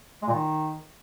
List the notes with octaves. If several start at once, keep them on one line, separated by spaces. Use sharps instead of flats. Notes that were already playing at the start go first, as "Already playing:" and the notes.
G#3
A#2
D#3